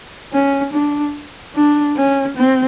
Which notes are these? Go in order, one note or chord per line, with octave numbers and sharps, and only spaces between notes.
C#4
D4
D4
C#4
C4